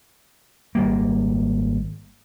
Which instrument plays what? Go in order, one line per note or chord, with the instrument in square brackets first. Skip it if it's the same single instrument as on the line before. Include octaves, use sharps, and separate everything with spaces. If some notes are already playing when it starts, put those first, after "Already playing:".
[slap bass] G#1 G3 A#3